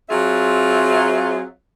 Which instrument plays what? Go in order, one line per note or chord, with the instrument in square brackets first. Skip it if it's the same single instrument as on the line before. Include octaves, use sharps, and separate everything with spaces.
[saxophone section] F#3 C4 F4 G#4 E5